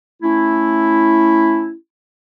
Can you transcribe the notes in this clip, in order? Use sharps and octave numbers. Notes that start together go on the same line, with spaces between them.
A3 C#4 E4